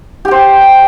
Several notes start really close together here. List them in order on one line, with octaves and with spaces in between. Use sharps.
G4 G5 C5